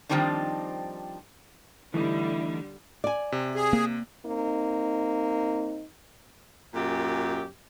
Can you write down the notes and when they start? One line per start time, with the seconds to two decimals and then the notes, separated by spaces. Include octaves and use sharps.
0.09 D#3 F3 G3 C4 D4 D#4
1.94 D3 E3 G3 A3 D#4 E4
3.04 D5 G#5
3.32 C3
3.55 G#4
3.73 A#3
4.26 A#3 C4 D#4
6.74 F#2 A#2 G4